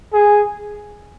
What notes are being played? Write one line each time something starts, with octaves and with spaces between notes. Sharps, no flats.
G#4